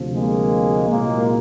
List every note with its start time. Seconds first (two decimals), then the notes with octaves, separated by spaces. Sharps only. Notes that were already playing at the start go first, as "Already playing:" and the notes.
Already playing: D2 C3 F3
0.15 G#3 A#3
0.89 C2 A#2 F#3 G#3 A#3